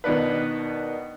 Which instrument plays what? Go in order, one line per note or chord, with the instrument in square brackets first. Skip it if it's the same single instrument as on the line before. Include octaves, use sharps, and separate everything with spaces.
[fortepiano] B2 D#3 B3 D4 B4